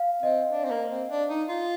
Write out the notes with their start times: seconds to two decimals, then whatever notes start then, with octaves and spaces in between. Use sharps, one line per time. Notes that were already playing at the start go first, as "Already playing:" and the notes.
Already playing: F5
0.22 C4 D#5
0.52 D4
0.64 C4
0.71 A#3
0.91 C4
1.10 D4
1.30 D#4
1.49 F4